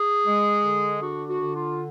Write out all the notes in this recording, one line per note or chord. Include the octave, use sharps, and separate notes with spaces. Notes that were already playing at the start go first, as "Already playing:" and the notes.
Already playing: G#4
G#3
D3
D4 F#4
F#4
D3
F4